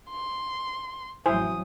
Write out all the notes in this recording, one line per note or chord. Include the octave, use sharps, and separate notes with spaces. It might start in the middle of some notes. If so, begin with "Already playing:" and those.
C6
A1 F2 F#3 E4 C5 G#5 D#6